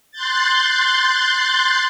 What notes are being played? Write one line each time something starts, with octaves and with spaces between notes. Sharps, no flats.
C6 F#6 G6 A6